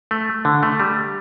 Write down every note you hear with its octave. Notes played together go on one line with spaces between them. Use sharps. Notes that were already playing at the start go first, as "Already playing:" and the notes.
A3
D3
A3
G3